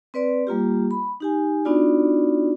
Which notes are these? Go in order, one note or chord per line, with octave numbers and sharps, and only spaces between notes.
C4 B4 D5 C6
G3 A#3 F4 G4
B5
D#4 G4 G#5
B3 D4 D#4 F4 F#4 D5